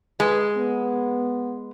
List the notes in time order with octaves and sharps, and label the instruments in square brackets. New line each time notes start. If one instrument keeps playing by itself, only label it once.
[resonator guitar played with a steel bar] G#3 [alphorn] B4
[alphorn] B3